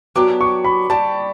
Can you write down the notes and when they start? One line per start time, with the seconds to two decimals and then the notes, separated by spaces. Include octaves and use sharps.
0.16 F#3 B3 D4 G4 D6
0.41 C#6
0.65 B5
0.90 G3 D4 G4 A5